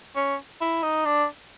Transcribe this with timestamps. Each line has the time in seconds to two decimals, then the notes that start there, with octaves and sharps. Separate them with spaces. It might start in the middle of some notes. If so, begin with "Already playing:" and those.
0.16 C#4
0.61 E4
0.83 D#4
1.05 D4